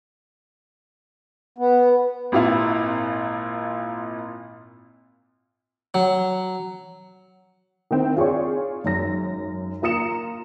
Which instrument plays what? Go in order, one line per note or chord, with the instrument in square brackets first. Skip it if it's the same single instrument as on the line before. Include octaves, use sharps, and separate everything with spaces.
[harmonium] B3
[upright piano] G#1 A#2 E4 F4 F5
[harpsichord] F#3
[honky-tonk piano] D#3 C4 E4
F4 G#4 C#5 D5 C#6
G#1 F#2 A#6
A#3 F4 A#5 D#6 C#7 E7